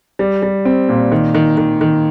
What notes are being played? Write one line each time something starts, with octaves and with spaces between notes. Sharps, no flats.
G3
G3
C4
A#2
D#3
D#3
D#3
D#3